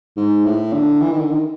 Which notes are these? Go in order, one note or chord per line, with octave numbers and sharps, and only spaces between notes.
G#2
A2
D3
E3
D#3
D3
D#3